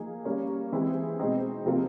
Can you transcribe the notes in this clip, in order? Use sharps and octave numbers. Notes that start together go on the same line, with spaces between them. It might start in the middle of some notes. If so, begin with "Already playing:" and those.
Already playing: F3 A#3 D#4 G#4
G3 A#3 C#4
E3 G#3 C4 E4 G#4
B2 G#3 C4 D#4
C3 F3 A#3